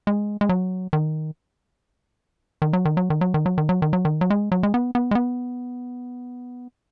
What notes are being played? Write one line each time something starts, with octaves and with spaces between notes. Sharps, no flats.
G#3
G#3
F#3
D#3
D#3
F#3
D#3
F#3
D#3
F#3
D#3
F#3
D#3
F#3
D#3
F#3
D#3
F#3
G#3
F#3
G#3
B3
B3
G#3
B3